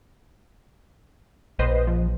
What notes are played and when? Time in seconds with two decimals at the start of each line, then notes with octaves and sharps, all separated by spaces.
1.59 A#1 B4 C5 D#5
1.87 F3